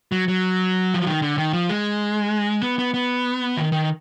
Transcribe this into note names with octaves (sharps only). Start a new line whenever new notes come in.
F#3
F#3
F3
D#3
D3
D#3
F3
G#3
B3
B3
B3
D#3
D#3